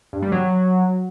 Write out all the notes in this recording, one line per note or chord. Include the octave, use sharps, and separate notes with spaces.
G2
G3
F#3